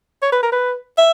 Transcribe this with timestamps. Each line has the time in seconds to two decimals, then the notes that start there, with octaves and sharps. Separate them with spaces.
0.22 C#5
0.32 B4
0.43 A#4
0.52 B4
0.98 E5